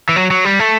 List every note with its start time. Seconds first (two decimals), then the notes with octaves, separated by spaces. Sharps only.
0.09 E3
0.16 F#3
0.31 F#3
0.45 G3
0.60 A3